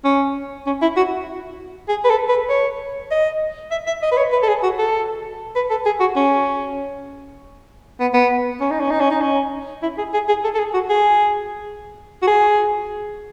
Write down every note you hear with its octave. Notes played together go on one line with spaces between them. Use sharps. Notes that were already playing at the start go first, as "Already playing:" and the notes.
C#4
C#4
E4
F#4
G#4
B4
A4
B4
C#5
D#5
E5
E5
D#5
B4
C#5
B4
A4
G#4
F#4
A4
B4
A4
G#4
F#4
C#4
B3
B3
C#4
D#4
C#4
D#4
C#4
D#4
C#4
E4
G#4
G#4
G#4
A4
A4
G#4
F#4
G#4
F#4
G#4